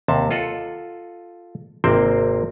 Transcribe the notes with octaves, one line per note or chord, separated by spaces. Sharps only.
D#2 C3 A5
F4 A4 D#5 F#5
G#1 C3 A#3 C4 C5 G5